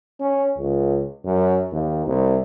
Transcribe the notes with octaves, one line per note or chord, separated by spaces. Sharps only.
C#4
C#2
F#2
D#2
C2